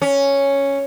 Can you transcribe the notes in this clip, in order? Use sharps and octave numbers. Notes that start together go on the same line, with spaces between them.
C#4